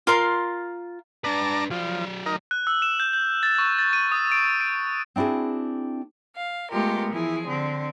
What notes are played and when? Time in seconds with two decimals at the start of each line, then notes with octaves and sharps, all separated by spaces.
0.07 F4 A#4 C6
1.24 D4 B4 D5 A5 A#5
1.71 F3 F#3 D5
2.26 D#4 A#4
2.51 F#6
2.67 E6
2.82 E7
3.00 G6
3.13 G6
3.43 A6
3.58 C#6
3.79 A6
3.93 D#7
4.12 D#6
4.32 D7
4.61 D7
5.16 C4 D4 E4 F#4 G#4
6.36 F5
6.71 G#3 A3 B3 F4 G4 A#4
7.12 E3 F3 E4 G#4
7.47 D3 C4